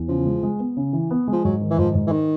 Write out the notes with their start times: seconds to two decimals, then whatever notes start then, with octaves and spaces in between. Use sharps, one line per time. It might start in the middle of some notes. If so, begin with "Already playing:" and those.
Already playing: E2
0.09 C#3 F3
0.26 G#3
0.43 G#3
0.59 B3
0.77 C#3
0.93 E3
1.11 B3
1.28 G#3
1.33 F3
1.45 G#2 F#3
1.61 D#3
1.70 E3
1.78 G#2 F3
1.95 G#2
2.07 E3
2.12 D#3